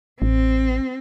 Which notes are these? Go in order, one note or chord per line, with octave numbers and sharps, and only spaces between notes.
A1 C4